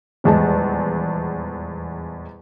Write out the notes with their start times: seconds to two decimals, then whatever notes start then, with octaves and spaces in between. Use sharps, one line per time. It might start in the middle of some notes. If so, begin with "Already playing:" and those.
0.24 D#1 E2 G#3 A5